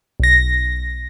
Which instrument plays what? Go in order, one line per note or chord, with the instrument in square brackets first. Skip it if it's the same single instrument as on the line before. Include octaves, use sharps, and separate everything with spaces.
[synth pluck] B1 A#6